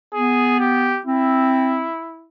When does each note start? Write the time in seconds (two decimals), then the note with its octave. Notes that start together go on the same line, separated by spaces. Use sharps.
0.14 B3 G#4
0.60 G4
1.06 C4 E4